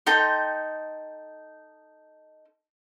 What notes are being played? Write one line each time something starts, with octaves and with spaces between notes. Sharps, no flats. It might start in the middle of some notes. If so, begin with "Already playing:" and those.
D#4 A4 G5 C6